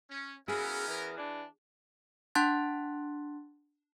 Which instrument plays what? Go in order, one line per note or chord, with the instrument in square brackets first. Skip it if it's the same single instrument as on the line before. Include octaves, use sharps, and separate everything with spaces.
[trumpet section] C#4
[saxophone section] C#3 E4 F#4 [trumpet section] B3 C#4 A#4 [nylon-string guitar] G#4
[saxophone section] E2 E3
E3 D4
[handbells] D4 F#5 A5 C6 F#6 A6